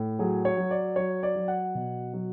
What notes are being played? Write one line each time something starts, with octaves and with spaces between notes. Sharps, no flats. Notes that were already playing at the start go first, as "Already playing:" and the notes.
Already playing: A2
F#3 G#4
C#5
F#3
D5
F#3 C#5
D5
F#3
F#5
B2
F#3